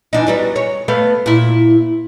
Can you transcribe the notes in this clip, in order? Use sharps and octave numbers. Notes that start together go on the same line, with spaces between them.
E3 D4 D#4
F#3 G3 B3
C#5
A3 B3 F5
A#2 E4